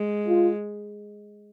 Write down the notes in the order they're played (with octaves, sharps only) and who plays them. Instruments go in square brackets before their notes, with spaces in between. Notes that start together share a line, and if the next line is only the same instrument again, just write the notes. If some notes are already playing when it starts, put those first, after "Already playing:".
Already playing: [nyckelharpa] G#3
[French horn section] F4